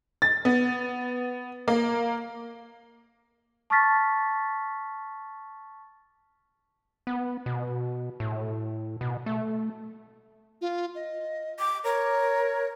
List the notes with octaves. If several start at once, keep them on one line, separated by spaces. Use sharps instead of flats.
A6
B3
A#3
A5 C#6 D6 F6 A6 B6
B3
B2
A2
B2
A3
F4
D#5
D6
A#4 C#5